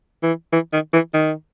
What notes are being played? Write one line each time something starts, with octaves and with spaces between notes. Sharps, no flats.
E3
E3
D#3
E3
D#3